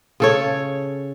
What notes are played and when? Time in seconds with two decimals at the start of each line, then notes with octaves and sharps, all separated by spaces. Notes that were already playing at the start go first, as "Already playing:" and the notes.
0.20 C#3 A4 C#5